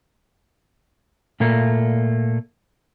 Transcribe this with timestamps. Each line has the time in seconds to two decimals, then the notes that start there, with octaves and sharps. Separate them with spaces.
1.40 A#2 A3 A#3